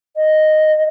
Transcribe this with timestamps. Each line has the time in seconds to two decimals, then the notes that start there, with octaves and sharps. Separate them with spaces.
0.17 D#5